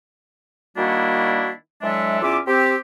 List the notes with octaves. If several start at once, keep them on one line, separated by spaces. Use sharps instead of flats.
D#3 G3 A#3 D4 E4 F#4
E3 F#3 G#3 D4 A4 E5
E2 C#4 F4 E5 D6
C4 G4